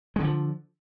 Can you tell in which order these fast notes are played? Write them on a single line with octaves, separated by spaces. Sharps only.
G#3 D3 F3